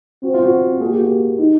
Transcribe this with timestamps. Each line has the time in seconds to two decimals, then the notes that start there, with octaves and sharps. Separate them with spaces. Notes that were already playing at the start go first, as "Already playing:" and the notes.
0.23 C4 F#4
0.34 F4
0.45 F#4
0.81 A#3 G#4
0.88 G4
0.96 F#4
1.03 G4
1.38 D#4